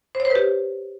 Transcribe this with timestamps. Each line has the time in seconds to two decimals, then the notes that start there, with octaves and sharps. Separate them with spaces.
0.15 C5
0.20 C#5
0.25 C5
0.30 B4
0.35 G4